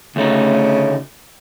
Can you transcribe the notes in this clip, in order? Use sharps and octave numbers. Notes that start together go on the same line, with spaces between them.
D2 C#3 A3 D#4